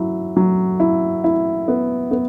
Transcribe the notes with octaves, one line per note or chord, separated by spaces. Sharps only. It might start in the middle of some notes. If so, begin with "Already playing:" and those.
Already playing: F#3 E4
F#3
E4
E4
B3
B3